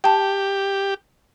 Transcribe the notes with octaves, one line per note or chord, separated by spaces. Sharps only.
G4 G5 A5